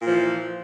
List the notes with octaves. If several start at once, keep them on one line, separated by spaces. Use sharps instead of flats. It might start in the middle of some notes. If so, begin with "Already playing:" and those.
A#2 E3 F3